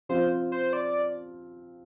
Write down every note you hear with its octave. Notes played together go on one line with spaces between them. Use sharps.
F3 C4 F4 C5
C5
D5